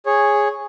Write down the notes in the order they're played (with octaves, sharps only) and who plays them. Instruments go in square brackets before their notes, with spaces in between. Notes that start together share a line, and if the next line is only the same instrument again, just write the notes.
[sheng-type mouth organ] G#4 C#5